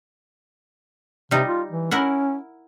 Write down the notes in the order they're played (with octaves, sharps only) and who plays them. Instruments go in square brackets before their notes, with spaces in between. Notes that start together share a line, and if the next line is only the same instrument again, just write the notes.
[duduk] C3 [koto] G3 D#4
[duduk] F4
E3
[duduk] C#4 [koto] E4 A#4 F#5